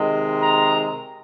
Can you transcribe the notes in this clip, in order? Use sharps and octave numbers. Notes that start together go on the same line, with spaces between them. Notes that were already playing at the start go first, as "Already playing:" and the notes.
Already playing: C3 D#3 G#3
A#5